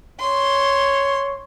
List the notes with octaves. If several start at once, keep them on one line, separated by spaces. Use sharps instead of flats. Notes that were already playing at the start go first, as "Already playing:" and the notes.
C#5 C6